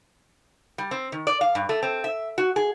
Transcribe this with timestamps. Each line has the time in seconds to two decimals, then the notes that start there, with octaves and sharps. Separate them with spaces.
0.78 G3
0.91 C4
1.12 D#3
1.27 D5
1.41 F5
1.55 G2
1.69 A3
1.83 C4
2.04 E5
2.38 F#4
2.56 G#4